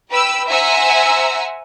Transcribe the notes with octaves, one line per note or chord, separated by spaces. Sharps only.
B4 G5 B5 E6
C5 E5 F#5 G#5 A#5 E6